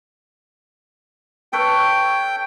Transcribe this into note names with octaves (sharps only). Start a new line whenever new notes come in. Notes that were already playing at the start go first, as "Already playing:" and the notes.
A4 B4 C#5 G5